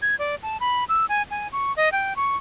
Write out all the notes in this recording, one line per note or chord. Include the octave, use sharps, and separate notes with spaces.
G#6
D5
A5
B5
E6
G#5
G#5
C#6
D#5
G5
C#6